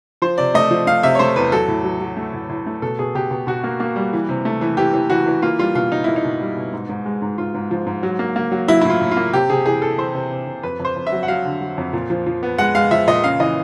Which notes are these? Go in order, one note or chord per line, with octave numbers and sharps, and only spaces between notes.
F3 C5
C3 D5
A3 D#5
F3
A3 F5
C3 E5
C#5
A3 C5
E2 B4
F#3 A4
A2
F#3
F#3
A3
A2
A2
A3
B2 A4
B2 G#4
B2 G4
B2
B2 F#4
A#3
A#3
G3
E3
C3
A3
E3
E3 G4
E3
E3 F#4
E3
A#3 F4
G3 F4
B2 F4
B2 D#4
A#3 E4
D#4
B2
G3
B2
G#2
G#2
G#3
G#2
G#2 F4
G#2
F3
G#2
F#3
A#3
A#3
F#3
F#3 E4
E4
A2 F4
A2
F4
A#3
C3 G4
C3 G#4
E3 G#4
E3 A4
E3 C5
C3
C3
C3
F2 B4
F2
C5
F2
E5
F#3
F#5
F#3 F5
D3
F#3
F2
A#2
F3
F3
B3
G#3 F#5
G#3 F5
F3 E5
A#2 D#5
C#3 F5
E3 D#5